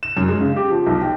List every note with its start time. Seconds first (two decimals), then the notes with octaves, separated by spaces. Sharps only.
0.03 E7
0.17 F#2
0.28 G#3
0.41 C#3
0.56 G4
0.70 F3
0.86 B1
1.01 G5